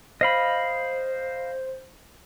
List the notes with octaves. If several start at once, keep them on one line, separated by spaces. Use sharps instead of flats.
C5 D#5 F5 B5